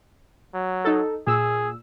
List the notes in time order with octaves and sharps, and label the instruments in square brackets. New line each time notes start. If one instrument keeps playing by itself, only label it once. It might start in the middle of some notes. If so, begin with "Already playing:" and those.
[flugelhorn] F#3
[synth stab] D#4 A4
[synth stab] A#2 E6 [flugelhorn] G#4